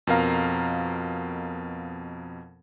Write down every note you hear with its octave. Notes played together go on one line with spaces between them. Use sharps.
F2 B2 A#4 F5 A#5